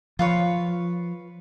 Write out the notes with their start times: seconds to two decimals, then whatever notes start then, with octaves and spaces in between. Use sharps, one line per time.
0.19 F3 F4 B4 C#5